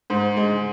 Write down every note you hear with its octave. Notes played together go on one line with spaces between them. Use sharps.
G#2
G#3